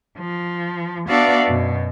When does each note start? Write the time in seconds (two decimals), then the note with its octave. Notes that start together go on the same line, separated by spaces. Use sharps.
0.17 F3
1.08 B3 D4 F#4 D5 E5 F5
1.47 F#2 B2